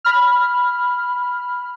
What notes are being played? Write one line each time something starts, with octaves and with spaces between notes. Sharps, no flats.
B5 F6